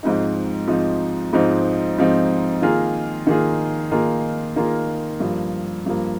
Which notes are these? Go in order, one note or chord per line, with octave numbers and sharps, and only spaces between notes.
G#2 F3 C4 D#4
G#2 F3 C4 D#4
G#2 F3 C4 D#4
G#2 F3 C4 D#4
D#3 A#3 F4 G#4
D#3 A#3 F4 G#4
D#3 A#3 F4 G#4
D#3 A#3 F4 G#4
G2 F3 A#3
G2 F3 A#3